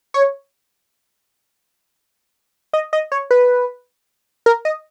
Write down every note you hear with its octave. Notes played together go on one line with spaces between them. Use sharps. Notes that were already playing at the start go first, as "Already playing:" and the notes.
C#5
D#5
D#5
C#5
B4
A#4
D#5